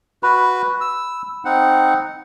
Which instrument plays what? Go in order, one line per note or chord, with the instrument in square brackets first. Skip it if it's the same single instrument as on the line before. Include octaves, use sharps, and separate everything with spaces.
[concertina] F#4 B4 [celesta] B5
[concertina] E6
C4 D#4 F#5